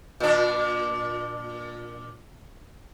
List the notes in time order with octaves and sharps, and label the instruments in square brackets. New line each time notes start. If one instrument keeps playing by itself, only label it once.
[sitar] A#2 D4